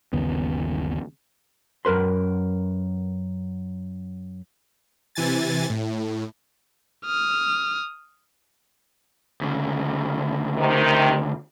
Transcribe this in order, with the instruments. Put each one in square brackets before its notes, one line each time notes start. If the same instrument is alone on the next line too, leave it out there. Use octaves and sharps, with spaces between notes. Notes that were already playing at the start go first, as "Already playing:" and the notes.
[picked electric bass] G1 D#2 C#3 B3
[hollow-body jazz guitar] F#2 A#4 B4 C6
[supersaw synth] C3 E3 G#5 A6
A2
[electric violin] D#6 F6
[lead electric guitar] D2 C#3
[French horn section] C3 D#3